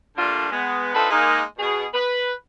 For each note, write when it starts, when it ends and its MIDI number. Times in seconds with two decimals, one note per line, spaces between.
0.17 0.47 46
0.17 0.47 50
0.17 0.47 55
0.17 0.47 57
0.17 0.47 62
0.17 0.47 65
0.51 0.93 56
0.51 0.93 59
0.93 1.06 60
0.93 1.06 62
0.93 1.06 63
0.93 1.06 65
0.93 1.06 69
0.93 1.06 71
1.10 1.41 56
1.10 1.41 58
1.10 1.41 63
1.58 1.85 47
1.58 1.85 68
1.94 2.33 71